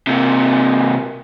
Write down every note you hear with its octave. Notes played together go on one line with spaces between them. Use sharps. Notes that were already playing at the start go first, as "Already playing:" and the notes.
C3 A#3